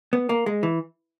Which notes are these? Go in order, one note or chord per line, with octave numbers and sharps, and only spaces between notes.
B3
A#3
G#3
E3